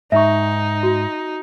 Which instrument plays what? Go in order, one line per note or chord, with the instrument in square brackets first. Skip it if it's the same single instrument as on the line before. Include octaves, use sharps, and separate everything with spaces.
[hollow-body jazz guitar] G#2 [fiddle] D#4 [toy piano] E5 C#6
[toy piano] F#4